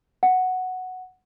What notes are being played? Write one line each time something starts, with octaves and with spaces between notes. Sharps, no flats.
F#5